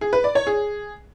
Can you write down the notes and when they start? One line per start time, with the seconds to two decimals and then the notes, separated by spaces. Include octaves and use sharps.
0.01 G#4
0.13 B4
0.24 D5
0.35 C#5
0.47 G#4